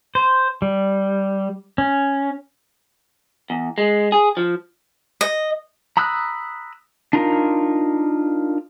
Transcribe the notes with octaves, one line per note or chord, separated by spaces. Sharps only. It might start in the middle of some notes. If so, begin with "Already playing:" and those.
C5
G3
C#4
E2
G#3
G#4
F3
D#5
A#5 B5 D#6 E6 F#6
D4 D#4 F4 A#4